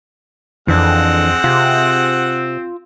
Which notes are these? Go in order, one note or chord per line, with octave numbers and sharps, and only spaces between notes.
F2 E3 G#3 C4 D4 A4 F#5
C3 F4